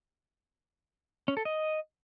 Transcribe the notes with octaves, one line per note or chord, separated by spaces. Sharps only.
C#4
A4
D#5